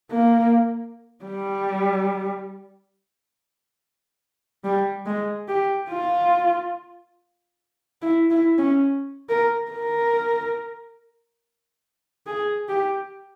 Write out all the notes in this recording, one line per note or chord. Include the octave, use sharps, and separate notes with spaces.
A#3
G3
G3
G#3
G4
F4
E4
E4
C#4
A#4
A#4
G#4
G4